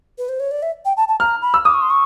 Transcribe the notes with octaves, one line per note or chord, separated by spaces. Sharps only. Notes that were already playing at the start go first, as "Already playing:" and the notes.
B4
C5
C#5
D5
E5
G5
A5
A5
A#5 F6
B5
E6
D6 D#6
C#6
C6
C#6